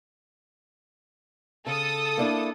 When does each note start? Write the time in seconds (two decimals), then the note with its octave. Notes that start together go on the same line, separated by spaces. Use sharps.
1.66 C#3 A4 D#6
2.18 A#3 D4 E4